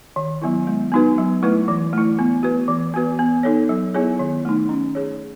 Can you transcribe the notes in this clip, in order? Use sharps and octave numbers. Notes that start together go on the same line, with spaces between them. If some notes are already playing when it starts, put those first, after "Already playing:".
D#3
F#3 B3 E4
G#3
B3 D#4 F#4 B4
F#3
A3 E4 B4
E3
A3 E4
B3
F#4 B4
E3
B3 F#4 B4
B3
D#4 A4 C#5
F#3
B3 E4 G#4 C#5
D#3
A3 D#4
C#4
G#4 C#5